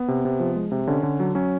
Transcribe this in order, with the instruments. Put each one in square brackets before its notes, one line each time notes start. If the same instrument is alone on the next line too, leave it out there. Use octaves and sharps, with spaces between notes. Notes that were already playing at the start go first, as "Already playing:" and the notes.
Already playing: [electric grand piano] B3
C3
C3
F3
G#3
C3
D3 C#4
D3
F#3
F#3 C#4